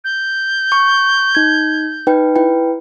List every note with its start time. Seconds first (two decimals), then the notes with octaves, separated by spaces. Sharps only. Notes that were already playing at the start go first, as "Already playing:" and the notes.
0.04 G6
0.72 C#6
1.35 D#4 G#6
2.07 D#4 B4 G5
2.36 E4 B4 G5